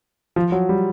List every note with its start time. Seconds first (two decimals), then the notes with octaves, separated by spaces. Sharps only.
0.36 F3
0.52 F#3
0.69 G3